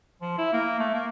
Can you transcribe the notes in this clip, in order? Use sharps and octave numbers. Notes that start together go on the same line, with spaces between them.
F3
E4
A#3
A3
A#3